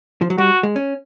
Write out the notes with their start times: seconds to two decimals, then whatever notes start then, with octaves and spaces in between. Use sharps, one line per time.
0.21 F3
0.30 F#3
0.38 G3 F#4
0.63 G#3
0.76 C#4